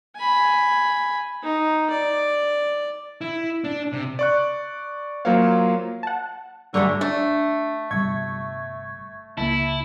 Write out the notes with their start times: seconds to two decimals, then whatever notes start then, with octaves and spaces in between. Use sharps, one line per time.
0.16 G#5 B5
1.43 D#4
1.90 D5
3.21 E4
3.64 D4
3.92 C3
4.19 D5 C#6 F#6
5.25 F#3 A#3 F4 C5 C#5 F5
6.03 F#5 A5
6.74 G2 D3 F#3 G#3 A3 C#6
7.01 A3 D4
7.91 G1 C3 G3 E5 C#6 G#6
9.38 C#2 A#3 E4 A5